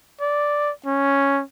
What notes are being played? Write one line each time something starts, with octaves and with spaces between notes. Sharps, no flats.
D5
C#4